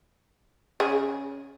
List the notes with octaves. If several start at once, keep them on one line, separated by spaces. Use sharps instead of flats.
C#3 G#4